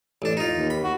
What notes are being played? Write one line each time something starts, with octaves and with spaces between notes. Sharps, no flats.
A1 D4
D#4 F4
D#2
B5
F#4